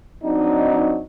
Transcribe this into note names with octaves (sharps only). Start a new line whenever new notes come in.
F#3 C4 D4 D#4